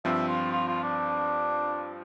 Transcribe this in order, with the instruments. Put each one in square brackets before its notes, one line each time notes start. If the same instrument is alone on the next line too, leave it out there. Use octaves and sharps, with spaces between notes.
[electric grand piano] G2 F3 C4 [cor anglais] E5
[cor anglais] F4
F4
F4
D4